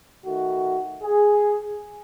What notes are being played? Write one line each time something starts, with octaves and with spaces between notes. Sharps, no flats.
D#3 A3 F#4
G#4